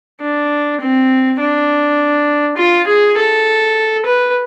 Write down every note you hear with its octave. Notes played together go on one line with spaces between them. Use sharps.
D4
C4
D4
F4
G#4
A4
B4